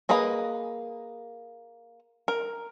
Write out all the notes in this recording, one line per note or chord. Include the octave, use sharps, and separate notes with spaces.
A#3 G#4 B4 D#5 A#5
A#4